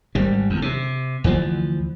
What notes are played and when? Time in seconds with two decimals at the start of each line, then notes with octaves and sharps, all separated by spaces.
0.15 G#1 G3
0.50 E2
0.62 C3
1.24 D2 E3 F3